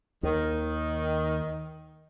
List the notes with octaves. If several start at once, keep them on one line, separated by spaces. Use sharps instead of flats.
D#2 D#3